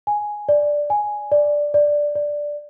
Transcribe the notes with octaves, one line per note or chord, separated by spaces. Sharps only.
G#5
D5
G#5
D5
D5
D5